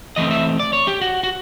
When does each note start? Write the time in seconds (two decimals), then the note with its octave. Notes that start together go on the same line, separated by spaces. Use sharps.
0.16 E3 A3 C4 D#5
0.31 E5
0.60 D5
0.73 C#5
0.87 G4
1.02 F#4
1.23 F#4